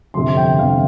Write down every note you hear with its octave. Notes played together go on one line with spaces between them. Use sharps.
G1 F2 C3 C6
G5
G1 F2 C3 F5